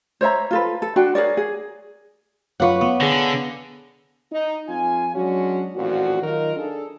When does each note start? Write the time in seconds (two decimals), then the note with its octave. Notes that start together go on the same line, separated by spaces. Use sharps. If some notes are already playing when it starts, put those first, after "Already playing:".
0.21 C5 C#5 E5 A#5
0.51 F4 A4 B4
0.82 A4
0.96 D4 F#4 G5
1.15 G#4 A#4 C#5 D5
1.37 G#4
2.60 F#2 F4 B4 C#5 F5 F#5 C#6 D6
2.81 B3
3.01 D3 G#4 A#6
4.32 D#4
4.68 F2 F4 G#5
5.15 F#3 G#3 C#4 D4 F#4
5.75 A1 F2 A#2 F#4
6.22 D#3 F#3 D#4 F4 A#4
6.57 D4 G#4 A4